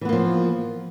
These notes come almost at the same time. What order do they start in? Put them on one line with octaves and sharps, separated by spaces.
E3 B3 A#3 F3